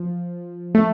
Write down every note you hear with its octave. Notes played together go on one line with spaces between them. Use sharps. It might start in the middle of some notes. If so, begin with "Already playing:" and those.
Already playing: F3
A3